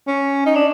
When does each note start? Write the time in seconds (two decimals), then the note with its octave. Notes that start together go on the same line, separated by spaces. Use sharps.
0.07 C#4
0.46 D#4
0.55 D4